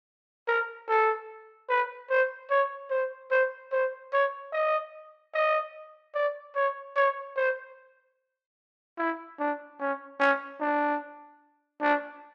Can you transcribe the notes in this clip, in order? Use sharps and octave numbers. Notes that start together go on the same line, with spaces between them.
A#4
A4
B4
C5
C#5
C5
C5
C5
C#5
D#5
D#5
D5
C#5
C#5
C5
E4
D4
C#4
C#4
D4
D4